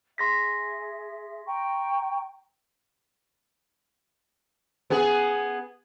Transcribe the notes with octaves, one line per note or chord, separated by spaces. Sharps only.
G#4 E5 C6 A#6 B6
G5 A#5 C#6
B3 G#4